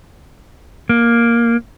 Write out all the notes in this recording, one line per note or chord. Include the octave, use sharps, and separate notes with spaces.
A#3